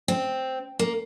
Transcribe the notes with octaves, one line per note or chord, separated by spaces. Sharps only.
C4
A#3